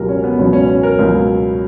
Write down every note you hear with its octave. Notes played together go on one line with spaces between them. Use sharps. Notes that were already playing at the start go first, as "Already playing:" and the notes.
Already playing: C#2 B2 F#3 G4 A#4
C#4
B3
C#2 B2 F#3 C#4
C#4
C#4
A#4
C#2 B2 F#3